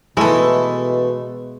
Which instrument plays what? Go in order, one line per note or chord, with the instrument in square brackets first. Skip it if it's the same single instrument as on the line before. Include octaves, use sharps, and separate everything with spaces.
[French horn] B2 [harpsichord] E3 A3 [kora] G#3 [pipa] E4 A4